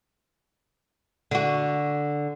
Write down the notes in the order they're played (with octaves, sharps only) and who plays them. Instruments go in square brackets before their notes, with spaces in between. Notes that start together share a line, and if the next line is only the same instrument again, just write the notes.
[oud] D3 F#4